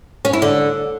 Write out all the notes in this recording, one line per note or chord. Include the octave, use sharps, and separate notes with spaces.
C#4
E4
D3